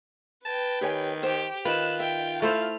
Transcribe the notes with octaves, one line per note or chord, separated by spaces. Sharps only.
B4 G5 A5
D#3 G4 C#5 G#5
G4 C5
D#3 F4 B4 F#6 E7
E5 G5
A3 E4 C5 F6